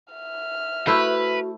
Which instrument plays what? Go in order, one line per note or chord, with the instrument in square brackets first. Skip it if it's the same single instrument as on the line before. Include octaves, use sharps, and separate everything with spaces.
[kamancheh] E5 F6
[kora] A3 E4 C5 [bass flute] F#4 [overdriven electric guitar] B4